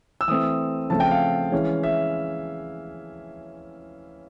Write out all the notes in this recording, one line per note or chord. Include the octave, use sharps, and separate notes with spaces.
E6
E3 A3 C4 D#6
C#3 F3 A3 C4 A5
G5
F5
E3 G#3 C#4
E5